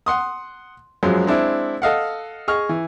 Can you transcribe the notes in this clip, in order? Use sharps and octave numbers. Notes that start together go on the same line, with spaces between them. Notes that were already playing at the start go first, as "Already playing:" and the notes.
F#5 C6 D#6
F#2 F3 F#3 G#3
G#3 C4 D4 E4
A4 D#5 F5 F#5
G#4 D#5 C#6 F6
E3